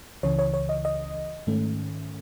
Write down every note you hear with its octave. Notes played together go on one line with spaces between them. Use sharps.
C#2 C#3 E3 C#5
C#5
C#5
D#5
D#5
G#2 D#3 A3 C#4